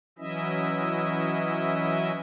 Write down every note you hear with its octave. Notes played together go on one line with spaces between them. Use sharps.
E3 F#3 C#4 E4 D#5 E5